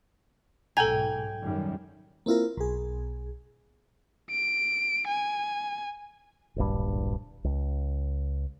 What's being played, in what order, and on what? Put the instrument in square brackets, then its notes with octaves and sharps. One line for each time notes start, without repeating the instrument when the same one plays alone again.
[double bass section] B1 G#2 [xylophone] A4 A#5 [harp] G5 G#5
[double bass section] F#2 D#3 G3
[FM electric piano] A#3 C4 E4 F4 A#4
B1 G#4
[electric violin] D7
G#5
[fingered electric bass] D1 A#1 G2
C#2